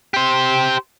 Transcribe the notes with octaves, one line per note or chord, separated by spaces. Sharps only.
G4 C5